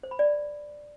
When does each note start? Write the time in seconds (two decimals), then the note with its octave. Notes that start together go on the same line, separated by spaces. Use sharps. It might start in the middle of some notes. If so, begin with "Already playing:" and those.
0.03 C5
0.11 B5
0.19 D5